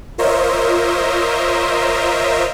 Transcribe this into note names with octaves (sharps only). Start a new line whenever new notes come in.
F4 A#4 C5 C#5 D#5 E5